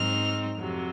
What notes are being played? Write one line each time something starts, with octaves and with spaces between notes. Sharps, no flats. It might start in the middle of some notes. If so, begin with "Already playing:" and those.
Already playing: G#2 F#3 C4 D#4 F6
F2 C3 F#3